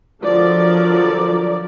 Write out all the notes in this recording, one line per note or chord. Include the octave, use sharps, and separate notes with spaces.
D3 F3 F#3 A4 A#4 D5